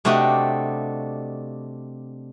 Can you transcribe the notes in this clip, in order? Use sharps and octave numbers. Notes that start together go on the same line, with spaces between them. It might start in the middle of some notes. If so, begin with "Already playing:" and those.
C3 A3 D4 F#4 G4 D#5